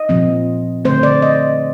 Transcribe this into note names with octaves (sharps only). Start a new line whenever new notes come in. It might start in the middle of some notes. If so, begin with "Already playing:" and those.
Already playing: D#5
A#2 F3 C4
D3 A3 C4 C5
D5
D#5